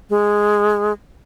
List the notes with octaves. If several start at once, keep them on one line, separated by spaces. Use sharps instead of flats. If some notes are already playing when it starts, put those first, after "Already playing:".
G#3